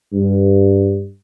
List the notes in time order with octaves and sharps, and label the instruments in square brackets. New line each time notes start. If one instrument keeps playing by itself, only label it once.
[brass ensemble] G2